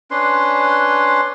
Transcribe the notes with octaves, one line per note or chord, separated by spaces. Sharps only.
C#4 D4 B4 C6